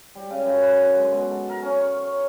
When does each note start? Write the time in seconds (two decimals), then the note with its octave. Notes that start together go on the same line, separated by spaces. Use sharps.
0.15 G3
0.31 C#3
0.45 F#2
0.61 B4
0.82 D3
0.97 G#3
1.13 B2
1.31 A4
1.49 A#4
1.63 C#4
1.80 C#6
1.97 C#5